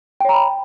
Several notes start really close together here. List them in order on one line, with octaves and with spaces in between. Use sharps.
G5 C#5 A#5 B5